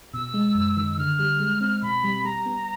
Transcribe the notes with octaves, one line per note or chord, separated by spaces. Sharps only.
B2 E6
G#3
F#2
D#3
D3 F6
G3
G#3
C4
B2 B5
G3
G3 A#5
B3